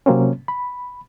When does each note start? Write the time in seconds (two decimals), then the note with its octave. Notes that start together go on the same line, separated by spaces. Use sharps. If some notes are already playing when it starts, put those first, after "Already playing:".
0.06 C3 F#3 A#3 C4 C#4
0.48 B5